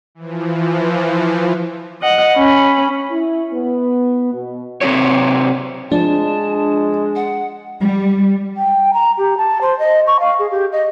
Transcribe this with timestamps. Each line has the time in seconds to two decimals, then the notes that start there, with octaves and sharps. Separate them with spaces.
0.15 E3 F3
2.02 D#5 F#5
2.36 C#4 B5
3.11 E4
3.53 B3
4.33 B2
4.81 C3 C4 D4 F#4 C#5
5.92 F3 G#3 D4 A5
7.16 F#5
7.78 G3
8.57 G5
8.94 A#5
9.18 G4
9.38 A5
9.61 C5
9.79 D#5
10.07 C#6
10.20 F5
10.39 G#4
10.51 G4
10.72 D#5